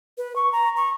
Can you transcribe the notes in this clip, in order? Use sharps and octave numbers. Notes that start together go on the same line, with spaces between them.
B4
C#6
A#5
C#6